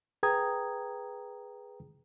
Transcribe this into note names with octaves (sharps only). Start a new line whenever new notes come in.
G#4 B4 G5 A#5 D#6 G#6